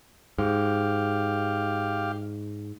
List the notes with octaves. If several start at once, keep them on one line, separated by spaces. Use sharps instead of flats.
G#2 G4 F5